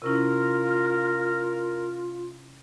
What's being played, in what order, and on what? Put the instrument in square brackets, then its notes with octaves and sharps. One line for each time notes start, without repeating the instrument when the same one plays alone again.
[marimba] C3 C#4 E4 [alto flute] F4 [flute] A#4